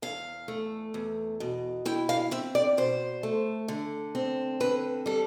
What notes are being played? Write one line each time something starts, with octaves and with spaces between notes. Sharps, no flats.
E2 F5
A3
E2
B2
E4 G5
F5
C4 E5
D5
B2 C5
A3
D3
C4
D3 B4
G3 A4